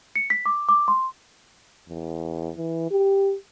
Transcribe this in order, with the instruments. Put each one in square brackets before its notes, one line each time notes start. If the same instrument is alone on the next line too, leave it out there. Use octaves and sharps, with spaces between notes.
[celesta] C#7
B6
D6
D6
C6
[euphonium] E2
E3
G4